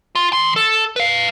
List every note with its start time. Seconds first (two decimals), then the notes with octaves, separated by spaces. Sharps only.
0.15 F4
0.33 E3 C6
0.56 A4
0.96 B4 F5